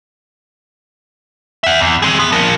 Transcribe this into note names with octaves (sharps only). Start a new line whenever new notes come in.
E5 F#5
E2
C4 G#4
B3
F3 A#4